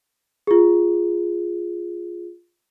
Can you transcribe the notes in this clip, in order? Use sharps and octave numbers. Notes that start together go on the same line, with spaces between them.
F4 G#4